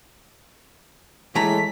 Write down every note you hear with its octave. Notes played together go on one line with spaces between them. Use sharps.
A2 E3 G#3 A3 A#5 B6